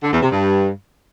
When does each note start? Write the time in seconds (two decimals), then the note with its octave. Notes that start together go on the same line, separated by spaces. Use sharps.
0.03 D3
0.13 E2
0.22 C3
0.32 G2